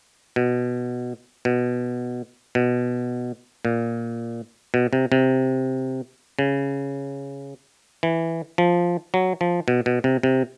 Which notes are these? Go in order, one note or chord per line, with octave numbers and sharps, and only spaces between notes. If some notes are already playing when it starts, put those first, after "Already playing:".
B2
B2
B2
A#2
B2
C3
C3
C#3
E3
F3
F#3
F3
B2
B2
C3
C3